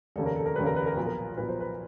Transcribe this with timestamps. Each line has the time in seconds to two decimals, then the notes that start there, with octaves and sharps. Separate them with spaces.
0.16 F1 D#2 C#3 A4
0.26 A#4
0.36 A4
0.46 A#4
0.56 F1 D#2 C#3 B4
0.66 A#4
0.76 B4
0.86 A#4
0.96 B1 A#2 F3 B4
1.06 A#4
1.37 B1 A#2 F3 B4
1.49 C5
1.60 B4